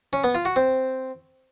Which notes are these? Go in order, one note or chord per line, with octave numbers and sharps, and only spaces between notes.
C#4
B3
F4
F#4
C4